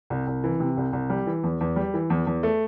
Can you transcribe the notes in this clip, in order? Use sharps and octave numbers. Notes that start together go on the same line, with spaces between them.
C2
C2
E3
C3
C2
C2
G3
E3
E2
E2
G3
E3
E2
E2
A3